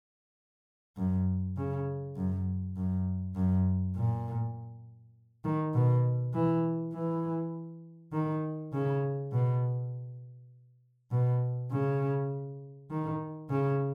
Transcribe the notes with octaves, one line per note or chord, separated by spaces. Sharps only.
F#2
C#3
F#2
F#2
F#2
A#2
D#3
B2
E3
E3
D#3
C#3
B2
B2
C#3
D#3
C#3